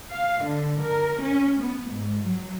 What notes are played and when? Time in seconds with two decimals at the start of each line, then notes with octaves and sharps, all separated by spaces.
0.11 F5
0.44 D3
0.80 A#4
1.20 C#4
1.60 B3
1.91 G#2
2.25 F#3